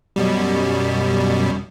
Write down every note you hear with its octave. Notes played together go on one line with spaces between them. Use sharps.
F#2 B2 G3